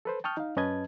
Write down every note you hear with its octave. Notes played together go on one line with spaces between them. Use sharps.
A4 B4 C5
G5 A5 C#6 D#6 F6 G6
D#4 F5
F#2 C#4 B4 D#5 A5 G#6